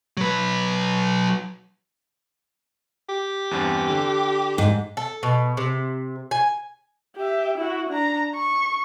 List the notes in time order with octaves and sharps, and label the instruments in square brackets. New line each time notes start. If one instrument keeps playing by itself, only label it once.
[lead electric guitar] F#3 B4
[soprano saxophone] G4
[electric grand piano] E2 G2 C4
D3
[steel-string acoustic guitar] G#2
[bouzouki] A4
B2
C3
G#5
[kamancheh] G4 E5
E4 F#4
D4 A#5
C#6